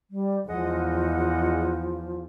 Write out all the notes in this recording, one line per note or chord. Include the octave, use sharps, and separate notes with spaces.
G3
E2 F3 G#3 D#5 F#5